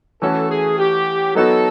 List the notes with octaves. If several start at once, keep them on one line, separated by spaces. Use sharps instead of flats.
E3 A3 C#4 F#4 A4
G#4
G4
F#3 B3 D#4 F#4 A4